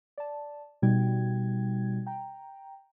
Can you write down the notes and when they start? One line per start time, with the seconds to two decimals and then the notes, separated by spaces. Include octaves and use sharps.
0.18 D5 A5
0.82 B2 G3 D#4 F#4 G5 G#6
2.07 G5 A#5